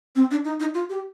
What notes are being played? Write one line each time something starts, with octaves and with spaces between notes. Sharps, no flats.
C4
D4
D#4
D#4
F4
G4